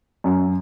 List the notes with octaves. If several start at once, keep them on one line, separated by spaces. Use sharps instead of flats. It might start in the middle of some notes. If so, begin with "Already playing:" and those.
F#2